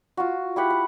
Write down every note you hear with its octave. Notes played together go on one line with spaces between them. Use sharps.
F4 F#4
E4 G4 F#5 B5
F#5